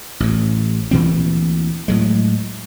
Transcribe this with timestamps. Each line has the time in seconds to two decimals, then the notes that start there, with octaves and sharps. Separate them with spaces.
0.20 A1 A2
0.91 D2 A#2 E3 C4
1.88 A2 F#3 G#3